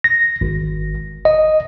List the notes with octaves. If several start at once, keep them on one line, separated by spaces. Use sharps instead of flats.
A#6
G#1
D#5